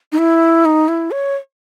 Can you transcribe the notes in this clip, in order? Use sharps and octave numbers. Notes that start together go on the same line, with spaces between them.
D#4
E4
D#4
E4
C#5